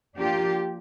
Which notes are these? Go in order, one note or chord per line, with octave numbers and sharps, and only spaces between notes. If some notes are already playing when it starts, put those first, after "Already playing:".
F3 A#3 D4 F4 G4